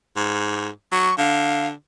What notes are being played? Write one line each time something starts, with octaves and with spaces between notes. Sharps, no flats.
G#2
F#3 C#6
D3 F5